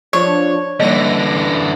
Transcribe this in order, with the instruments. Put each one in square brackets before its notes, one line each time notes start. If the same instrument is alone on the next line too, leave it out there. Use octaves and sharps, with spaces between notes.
[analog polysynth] F3 D4 [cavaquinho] C#5 [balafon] C#6
[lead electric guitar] D3 E3 [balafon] G3 A#3 D#5 [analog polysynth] A#6